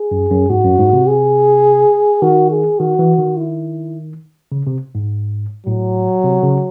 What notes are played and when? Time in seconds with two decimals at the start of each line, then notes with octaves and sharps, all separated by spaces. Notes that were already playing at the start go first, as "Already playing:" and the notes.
Already playing: G#4
0.11 F#2
0.31 F#2
0.50 G#2 F#4
0.65 F#2
0.79 G#2
0.93 C3
1.08 G#4
2.22 D#3 F#4
2.51 G#4
2.79 D#3 F#4
2.99 E3
3.18 D#3
3.37 E4
4.52 C#3
4.67 C3
4.95 G#2
5.67 A2 F#3
6.24 C3
6.43 C#3